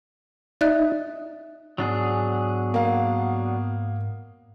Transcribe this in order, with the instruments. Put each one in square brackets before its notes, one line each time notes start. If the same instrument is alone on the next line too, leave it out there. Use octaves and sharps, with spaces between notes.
[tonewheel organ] D#4 [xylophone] D5 E5 F#6
[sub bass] G#2 [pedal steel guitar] F#3 D4 G#4 [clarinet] B3
[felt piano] A#3 F5